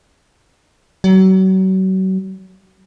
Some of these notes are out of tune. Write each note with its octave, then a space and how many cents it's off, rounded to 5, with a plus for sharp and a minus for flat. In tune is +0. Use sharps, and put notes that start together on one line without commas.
F#3 +35